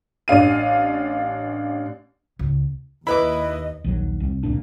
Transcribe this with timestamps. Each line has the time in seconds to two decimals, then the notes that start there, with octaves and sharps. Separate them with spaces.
0.28 A1 D4 F5 D#7
2.39 C#2
3.07 D#2 E4 B4 D#5 B5 D6
3.84 A#1 D#2 F#3
4.20 C2
4.43 D1 C2 A#2 D4